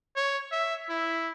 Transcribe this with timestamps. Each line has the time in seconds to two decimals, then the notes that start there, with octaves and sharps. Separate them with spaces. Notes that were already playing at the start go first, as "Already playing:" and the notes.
0.16 C#5
0.52 E5
0.90 E4